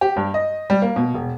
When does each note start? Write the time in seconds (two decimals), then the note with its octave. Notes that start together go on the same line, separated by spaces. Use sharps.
0.01 G4
0.16 G2
0.34 D#5
0.70 G3
0.82 A#3
0.96 B2
1.14 E1